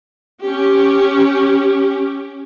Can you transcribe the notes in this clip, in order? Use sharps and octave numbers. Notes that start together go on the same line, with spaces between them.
C#4 G4